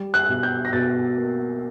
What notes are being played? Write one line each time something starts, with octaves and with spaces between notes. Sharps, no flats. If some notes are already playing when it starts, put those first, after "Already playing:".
Already playing: G3
F#6
B2
G6
A#6
B2 A6
A#3